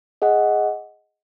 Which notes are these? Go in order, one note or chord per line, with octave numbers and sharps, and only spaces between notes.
G#4 D#5 F#5